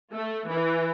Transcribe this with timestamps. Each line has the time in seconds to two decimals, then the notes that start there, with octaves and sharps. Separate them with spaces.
0.13 A3
0.49 E3